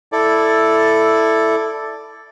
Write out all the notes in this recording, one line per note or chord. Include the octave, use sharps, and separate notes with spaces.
E4 A4 D5